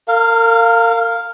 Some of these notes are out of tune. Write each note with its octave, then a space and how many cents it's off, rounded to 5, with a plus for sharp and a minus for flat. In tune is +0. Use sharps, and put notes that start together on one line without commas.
A#4 -35 F5 +0